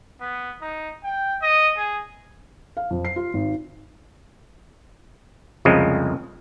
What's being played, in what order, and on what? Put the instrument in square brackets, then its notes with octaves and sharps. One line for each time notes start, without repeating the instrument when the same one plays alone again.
[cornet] B3
D#4
G5
D#5
G#4
[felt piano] F5
F2
C7
F4
G#1
[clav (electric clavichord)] C2 F2 C#3 F3 G#3